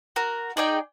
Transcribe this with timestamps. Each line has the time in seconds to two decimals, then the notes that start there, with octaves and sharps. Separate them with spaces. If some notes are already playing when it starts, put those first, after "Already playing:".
0.16 F#4 A#4
0.57 D#4 G#4 D5 G5